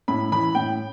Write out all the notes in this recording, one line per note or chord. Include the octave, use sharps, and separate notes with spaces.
A2 B5
E3 B5
A2 G5